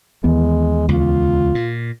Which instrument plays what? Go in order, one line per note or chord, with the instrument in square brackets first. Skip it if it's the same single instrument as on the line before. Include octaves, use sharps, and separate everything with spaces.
[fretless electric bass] D#2 E3 B3 [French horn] G#3
[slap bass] C#2 [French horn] F4
[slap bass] A#2